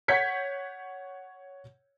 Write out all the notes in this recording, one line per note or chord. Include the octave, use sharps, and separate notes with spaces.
C#5 F#5 G6 G#6 B6 C#7